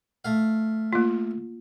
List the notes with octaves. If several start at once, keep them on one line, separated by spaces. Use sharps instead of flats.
A3 F5
A#3 F4